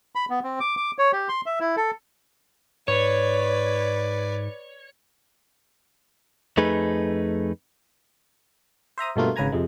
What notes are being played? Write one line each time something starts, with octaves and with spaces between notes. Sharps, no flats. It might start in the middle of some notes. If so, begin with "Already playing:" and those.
B5
B3
C4
D6
D6
C#5
G4
C6
E5
E4
A4
G#2 B4 C#5 D5
F2 A3 D#4 G#4 B4
C5 E5 A#5 D#6
G2 B2 D3 A3 A#3 F4
G#1 C#3 B4 G#5 A#5 G#6
F2 C3 G#3